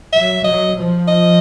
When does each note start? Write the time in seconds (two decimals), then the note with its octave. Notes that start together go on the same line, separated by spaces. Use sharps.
0.13 F#3 E5
0.44 F#3 D#5
0.76 F3
1.08 D#5